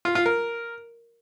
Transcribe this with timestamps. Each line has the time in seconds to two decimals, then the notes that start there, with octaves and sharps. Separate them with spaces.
0.05 F4
0.15 F4
0.26 A#4